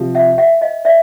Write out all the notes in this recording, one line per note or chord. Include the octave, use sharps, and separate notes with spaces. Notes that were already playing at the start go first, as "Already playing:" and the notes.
Already playing: C3 F3
E5 F#5
E5 F#5
D#5 F5
D5 E5